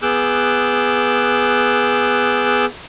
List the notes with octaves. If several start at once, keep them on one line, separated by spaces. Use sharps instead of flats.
B3 G#4 D6 E6 F#6 G6